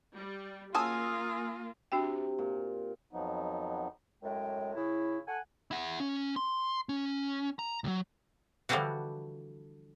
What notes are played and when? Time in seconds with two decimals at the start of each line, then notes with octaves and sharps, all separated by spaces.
0.15 G3
0.75 C#3 F#3 A#3 F4 G#5 A5 D#6 E6
1.92 C3 D4 F#4 G5
2.39 A#2
3.13 F2 F3 F#3 B3 D#4
4.23 F#2 A2 G#3 G5
4.75 C#3 E4
5.27 A4 F#5 G#5
5.71 E4 F#5
6.00 C#4
6.36 C6
6.89 C#4
7.59 A#5
7.84 C#2 F#3
8.69 D3 E3 F3 G3 D4 F#4